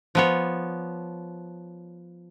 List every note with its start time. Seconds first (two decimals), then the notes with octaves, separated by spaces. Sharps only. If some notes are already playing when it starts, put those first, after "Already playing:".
0.15 F3 B3 C#5